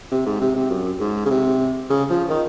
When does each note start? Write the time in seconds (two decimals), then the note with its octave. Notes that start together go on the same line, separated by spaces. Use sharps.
0.11 C3
0.26 G#2
0.41 C3
0.56 C3
0.70 F#2
1.00 G#2
1.26 C#3
1.30 C3
1.90 C#3
2.10 F3
2.29 D#3